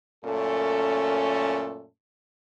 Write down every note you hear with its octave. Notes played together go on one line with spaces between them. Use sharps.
F#2 A#2 A3 C#4 A4